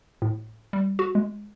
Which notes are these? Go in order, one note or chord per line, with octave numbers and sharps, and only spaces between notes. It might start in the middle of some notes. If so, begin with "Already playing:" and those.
A2
G3
F#4
G#3